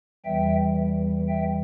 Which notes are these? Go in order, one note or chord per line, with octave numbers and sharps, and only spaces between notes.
E2 E3 G3 E5 G5
E5 G5